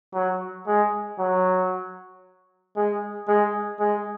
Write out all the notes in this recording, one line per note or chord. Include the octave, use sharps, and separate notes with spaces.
F#3
G#3
F#3
G#3
G#3
G#3